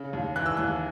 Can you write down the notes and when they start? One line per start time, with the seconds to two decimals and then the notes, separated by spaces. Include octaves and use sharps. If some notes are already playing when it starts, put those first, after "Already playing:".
Already playing: C#3
0.13 D#2
0.36 E3 F#6
0.46 E6
0.57 D#2 F#6